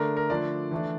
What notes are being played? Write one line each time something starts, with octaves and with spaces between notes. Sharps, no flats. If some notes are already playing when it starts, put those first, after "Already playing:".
Already playing: D3 A3 D4 A#4
A#4
D3 F3 A3 D4 D5
E3 A3 D4